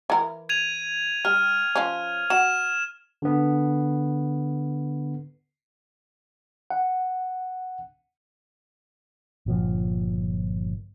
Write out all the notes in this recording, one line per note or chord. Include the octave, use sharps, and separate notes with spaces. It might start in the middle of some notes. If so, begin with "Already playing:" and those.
E3 A#4
G#6 D#7 F7
G3 F6
F3 C#4
F#4 E7
D3 B3
F#5
G1 A#2 F3